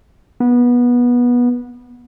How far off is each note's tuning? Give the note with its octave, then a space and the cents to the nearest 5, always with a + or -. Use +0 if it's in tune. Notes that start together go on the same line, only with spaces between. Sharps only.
B3 -20